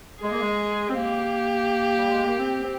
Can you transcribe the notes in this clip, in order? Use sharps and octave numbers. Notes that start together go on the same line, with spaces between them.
G#3 G#4
A#3
G#3
C4
A#3 G4
G3
G#3
A#3
C4
C4